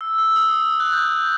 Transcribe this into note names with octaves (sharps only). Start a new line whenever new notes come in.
E6
E6
D#6
E6
F#6
G6